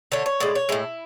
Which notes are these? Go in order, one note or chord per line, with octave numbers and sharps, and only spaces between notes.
D3 A3 C#5
C#5
A2 G#3 D5
C#5
A2 G#3 E4